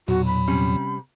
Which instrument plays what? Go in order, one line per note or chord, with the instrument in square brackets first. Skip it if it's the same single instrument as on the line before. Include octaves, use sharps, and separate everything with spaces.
[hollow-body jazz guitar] B1 [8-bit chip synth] E2 A#2 F#3 [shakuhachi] F#4
[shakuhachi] B5
[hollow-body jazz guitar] C3 G3 C#4